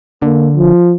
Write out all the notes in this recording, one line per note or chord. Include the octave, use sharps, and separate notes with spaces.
D3 A#3
F3